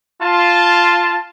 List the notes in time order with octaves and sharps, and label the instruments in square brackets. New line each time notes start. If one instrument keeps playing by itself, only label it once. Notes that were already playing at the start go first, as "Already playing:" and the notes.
[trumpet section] F4 A5